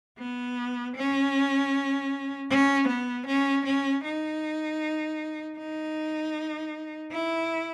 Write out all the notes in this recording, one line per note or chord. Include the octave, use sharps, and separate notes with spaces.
B3
C#4
C#4
B3
C#4
C#4
D#4
D#4
E4